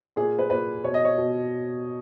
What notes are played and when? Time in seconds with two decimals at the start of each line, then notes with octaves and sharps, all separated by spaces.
0.16 A#2 G#4
0.39 B4
0.50 A#2 B4
0.84 B2 C#5
0.94 D#5
1.05 C#5
1.18 B2